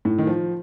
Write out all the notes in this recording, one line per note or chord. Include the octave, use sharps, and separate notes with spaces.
A2
D#3
F3